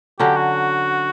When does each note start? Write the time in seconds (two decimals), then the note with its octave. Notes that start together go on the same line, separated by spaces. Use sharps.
0.19 D3 F#3 C#4 G4
0.37 F#4